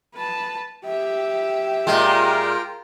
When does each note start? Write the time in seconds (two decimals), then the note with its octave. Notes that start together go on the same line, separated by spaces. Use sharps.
0.15 B4 A5
0.86 G4 E5
1.87 A#2 G#3 F4 A#4 G5